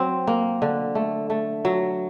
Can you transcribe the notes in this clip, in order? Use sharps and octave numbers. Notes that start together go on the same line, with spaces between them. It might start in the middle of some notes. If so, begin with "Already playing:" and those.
Already playing: F#3 C4
A#3
D3
A3
A3
F#3